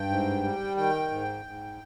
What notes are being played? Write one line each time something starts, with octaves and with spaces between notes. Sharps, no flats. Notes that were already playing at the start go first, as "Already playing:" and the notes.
Already playing: G2 G5
G#2
G3
D#3 G5
G#2
G#2